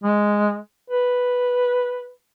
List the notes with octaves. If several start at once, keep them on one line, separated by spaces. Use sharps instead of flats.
G#3
B4